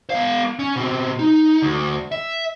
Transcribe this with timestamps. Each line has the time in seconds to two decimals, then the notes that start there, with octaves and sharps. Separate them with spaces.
0.10 B3 F5
0.59 C#4
0.76 B2 C4
1.19 D#4
1.62 D2
2.12 E5